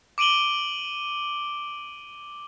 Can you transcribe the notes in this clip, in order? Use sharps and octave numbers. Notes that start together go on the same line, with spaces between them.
D6 D7 D#7 F#7 G7